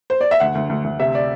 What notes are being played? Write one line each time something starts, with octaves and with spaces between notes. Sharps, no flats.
C5
D5
E5
D2 F#5
D2
D2
D2
C3 E5
D5